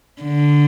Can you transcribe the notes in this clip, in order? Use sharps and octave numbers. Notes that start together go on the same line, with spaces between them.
D3